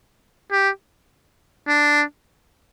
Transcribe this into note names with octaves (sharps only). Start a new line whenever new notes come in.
G4
D4